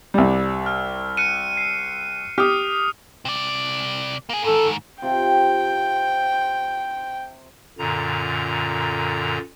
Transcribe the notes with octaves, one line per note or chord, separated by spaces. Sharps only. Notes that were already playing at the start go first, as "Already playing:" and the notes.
C2 G3
F6
F#6 C#7 D#7
C7
G4 D#6 F6
C3 D5
A#3 G#4
G#2 D#3 A4
C3 C4 F4 G5
F#2 A#2 D3 A#5